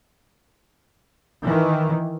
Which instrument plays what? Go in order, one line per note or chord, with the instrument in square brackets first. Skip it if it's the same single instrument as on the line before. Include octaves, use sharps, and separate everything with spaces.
[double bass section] D#3 E3